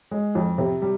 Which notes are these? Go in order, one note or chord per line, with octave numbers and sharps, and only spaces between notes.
G#3
F2
C3
G3